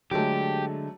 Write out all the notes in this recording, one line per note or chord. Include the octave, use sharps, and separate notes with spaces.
D3 F#3 G#3 A3 G4